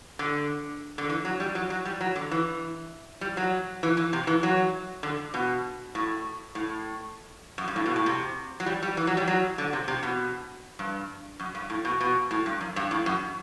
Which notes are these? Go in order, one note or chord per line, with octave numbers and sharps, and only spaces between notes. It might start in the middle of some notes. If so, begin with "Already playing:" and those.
D3
D3
E3
F#3
G3
F#3
F#3
G3
F#3
D3
E3
G3
F#3
E3
E3
C3
E3
F#3
D3
B2
A2
A2
F#2
G2
A2
B2
A2
C3
F#3
G3
G3
E3
F#3
G3
F#3
D3
C3
C3
B2
G2
F#2
G2
A2
B2
B2
A2
G2
F#2
G2
A2
F#2